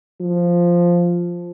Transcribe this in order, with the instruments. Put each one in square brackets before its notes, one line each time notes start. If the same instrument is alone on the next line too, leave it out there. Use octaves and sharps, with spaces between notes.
[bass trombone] F3